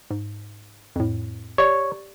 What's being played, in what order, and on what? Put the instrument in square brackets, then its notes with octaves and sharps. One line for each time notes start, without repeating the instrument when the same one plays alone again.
[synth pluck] G#2
F2 A2
[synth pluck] G4 D5 [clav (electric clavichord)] C#5